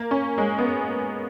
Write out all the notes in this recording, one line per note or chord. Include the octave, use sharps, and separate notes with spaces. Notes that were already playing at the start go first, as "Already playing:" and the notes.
Already playing: A#3
C#4
G#3
B3